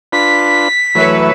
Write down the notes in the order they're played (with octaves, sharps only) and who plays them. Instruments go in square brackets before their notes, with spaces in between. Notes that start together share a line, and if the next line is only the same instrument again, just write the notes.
[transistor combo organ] D4 F4 B4 [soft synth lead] B6
[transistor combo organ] E3 F#3 A3 [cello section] B4 C#5 E5